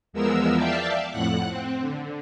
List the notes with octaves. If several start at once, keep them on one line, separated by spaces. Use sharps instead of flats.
E2 F3 G#3 B3 A#4 E6
D5 E5 F5 G5 A5
F2 A2 F#5 F#6
C4
D3